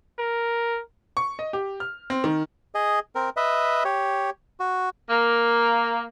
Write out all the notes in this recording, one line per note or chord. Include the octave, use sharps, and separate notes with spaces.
A#4
C#6
D#5
G4
F6
C4
D#3
G#4 D#5
C4 A#4
B4 D#5 E5
G4 C#5
F#4
A#3